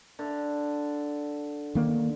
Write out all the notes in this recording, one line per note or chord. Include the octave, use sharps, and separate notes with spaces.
D3
D#3 A#3 D4